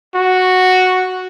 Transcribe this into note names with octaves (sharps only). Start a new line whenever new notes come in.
F#4